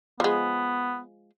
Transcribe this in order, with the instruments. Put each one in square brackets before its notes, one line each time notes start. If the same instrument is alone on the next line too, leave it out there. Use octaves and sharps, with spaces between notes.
[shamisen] F3 G#3 [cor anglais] B3